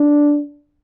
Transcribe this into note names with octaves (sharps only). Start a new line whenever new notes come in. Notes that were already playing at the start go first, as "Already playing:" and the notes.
Already playing: D4